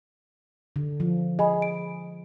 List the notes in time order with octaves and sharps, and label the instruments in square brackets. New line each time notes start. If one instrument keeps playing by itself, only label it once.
[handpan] D3
F3
[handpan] G#4 [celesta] D#5 G#5 B5
[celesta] D7